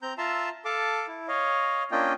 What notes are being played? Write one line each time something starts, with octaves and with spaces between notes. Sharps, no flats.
C4 A#5 G6
F4 E5 A5 A#5 C6 E6
A4 F5 A5 D6
E4
C#5 D#5 F5
A#3 C#4 D4 F4 D#5 G5